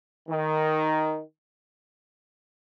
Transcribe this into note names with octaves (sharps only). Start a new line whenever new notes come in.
D#3